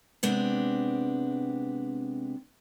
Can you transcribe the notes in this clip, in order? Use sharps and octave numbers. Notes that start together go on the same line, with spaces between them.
C3 G#3 B3 C4 D4